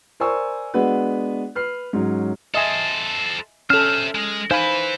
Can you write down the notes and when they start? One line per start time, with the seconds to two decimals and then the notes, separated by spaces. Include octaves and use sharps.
0.20 A#4 C5 D5 G#5 C#6 E6
0.74 G#3 B3 D4 F#4 B4
1.55 B4 F6 C7
1.93 G#2 F#3 C#4
2.54 A4 C5 D#5 E5 G#5
3.70 C#4 A4 C5 E5 F6
4.15 G#3
4.51 D#4 E4 B4 C5 F5 G#5 B5